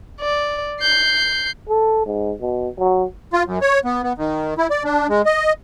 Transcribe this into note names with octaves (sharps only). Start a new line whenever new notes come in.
D5
G6 C7
A4
G#2
B2
F#3
F4
F#2
C#5
B3
B3
D#3
E4
D5
D4
G#3
D#5